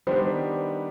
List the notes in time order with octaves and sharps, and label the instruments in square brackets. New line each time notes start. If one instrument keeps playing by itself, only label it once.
[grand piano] D#3 G3 B3 D4 [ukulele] C5